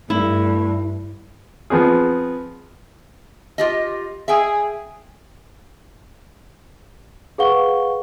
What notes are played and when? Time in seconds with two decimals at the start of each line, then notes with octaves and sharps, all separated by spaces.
0.10 G2 A3 E4
1.70 F3 B3 C4 G#4
3.58 F4 G4 D#5
4.28 G#4 E5 G5 G#5
7.38 G#4 B4 F5 F#5 C#6 G7